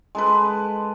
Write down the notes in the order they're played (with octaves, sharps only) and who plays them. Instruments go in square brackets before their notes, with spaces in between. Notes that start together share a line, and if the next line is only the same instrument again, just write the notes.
[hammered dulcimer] G#3 A4 B4